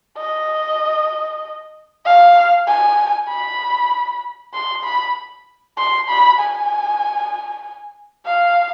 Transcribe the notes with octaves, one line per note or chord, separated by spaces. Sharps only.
D#5
F5
G#5
B5
C6
B5
C6
B5
G#5
F5